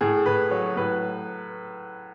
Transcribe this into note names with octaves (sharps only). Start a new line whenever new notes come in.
A2 G#4
A2 B4
F#3 C#5
A2 B4